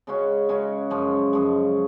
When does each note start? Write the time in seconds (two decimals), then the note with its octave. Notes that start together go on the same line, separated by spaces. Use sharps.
0.07 C#3 G#3 C#4 F#4
0.49 C#3 G#3 C#4 F#4
0.90 F#2 F3 G#3
1.33 F#2 F3 G#3